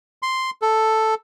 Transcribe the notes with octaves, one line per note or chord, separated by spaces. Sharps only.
C6
A4